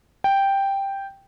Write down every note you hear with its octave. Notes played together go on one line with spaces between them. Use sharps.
G5